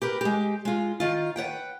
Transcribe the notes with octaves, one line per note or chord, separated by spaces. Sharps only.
G4 A#4 B4
G#3 G4
G#3 F4
D#3 F4
B4 C#5 F#5 G5